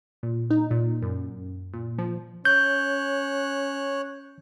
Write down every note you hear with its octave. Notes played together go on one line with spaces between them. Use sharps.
A#2
D#4
A#2
F#2
A#2
F3
C#4 C#5 F#6 G6